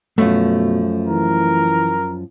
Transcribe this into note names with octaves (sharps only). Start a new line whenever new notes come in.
F#2 B2 F3 A3
E3 A#4